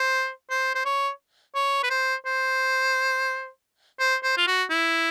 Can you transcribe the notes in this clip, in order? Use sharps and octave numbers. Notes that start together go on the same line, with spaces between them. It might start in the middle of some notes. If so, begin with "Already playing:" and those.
Already playing: C5
C5
C5
C#5
C#5
B4
C5
C5
C5
C5
F4
F#4
E4